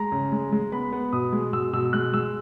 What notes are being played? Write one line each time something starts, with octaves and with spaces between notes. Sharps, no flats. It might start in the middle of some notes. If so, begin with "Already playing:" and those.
Already playing: G#3 A#5
C#3
G#3
G#3
B3 B5
B3
B2 D#6
G#3
B2 E6
B2 E6
G#3 F#6
G#3 E6